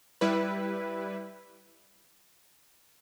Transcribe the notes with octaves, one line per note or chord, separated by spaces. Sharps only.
G3 E4 B4